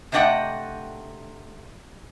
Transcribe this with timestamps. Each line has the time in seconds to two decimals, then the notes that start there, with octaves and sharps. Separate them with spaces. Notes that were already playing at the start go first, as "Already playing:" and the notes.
0.12 C3 A3 D4 D#5 F#5 G5